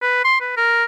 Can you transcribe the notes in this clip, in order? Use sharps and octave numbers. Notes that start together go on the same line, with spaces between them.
B4
C6
B4
A#4